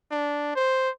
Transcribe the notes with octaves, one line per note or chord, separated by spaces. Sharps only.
D4
C5